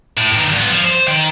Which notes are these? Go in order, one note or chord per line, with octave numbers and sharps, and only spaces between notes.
A2
G2 D#3
G2 B3
F3
C5
D#3 G5